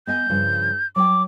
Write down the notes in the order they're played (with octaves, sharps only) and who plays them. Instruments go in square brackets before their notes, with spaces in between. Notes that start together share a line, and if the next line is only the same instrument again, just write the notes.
[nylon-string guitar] B3 D#5 G#5 [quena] G6
[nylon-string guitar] G2 C#3 F3
[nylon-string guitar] F#3 C#5 G5 [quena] D6